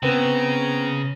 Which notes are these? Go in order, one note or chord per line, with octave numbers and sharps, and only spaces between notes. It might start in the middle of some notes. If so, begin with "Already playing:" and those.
C#3 B3 C4 A#5